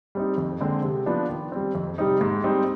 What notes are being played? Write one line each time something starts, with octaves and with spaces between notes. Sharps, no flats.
G3 C4 D#4
F2
D3 G#3 C4
C3
F3 B3 D4
D#3
G3 C4
F2
C3 G3 C4 D#4
G#2
G3 C4 D#4